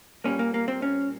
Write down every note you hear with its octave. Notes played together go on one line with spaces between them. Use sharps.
A#2 G3 A#3 C#4
A#3
A#3
C4
C#4